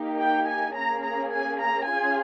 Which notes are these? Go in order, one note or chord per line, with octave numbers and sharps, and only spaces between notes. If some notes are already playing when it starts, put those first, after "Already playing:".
Already playing: A#3 D#4 G4
G5
G#5
A#3 C#4 G#4 A#5
A#5
G#5
A#5
C#4 F4 G#4 G#5